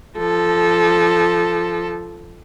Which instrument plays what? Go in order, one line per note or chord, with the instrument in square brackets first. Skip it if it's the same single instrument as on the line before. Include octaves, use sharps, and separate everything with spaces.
[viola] F3 A4